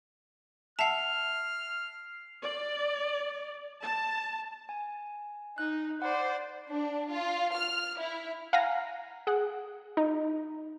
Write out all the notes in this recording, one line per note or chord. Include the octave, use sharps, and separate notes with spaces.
E5 F#5 A5 F6 C7 F7
D5
A5
G#5
D#4 F#6
C5 D5 F#5
D4
F4
F6
E4
F5 F#5 G#5 A#5 A#6
G#4 F#5
D#4